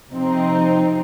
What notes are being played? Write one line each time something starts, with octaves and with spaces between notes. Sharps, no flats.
C3 F3 C4 D#4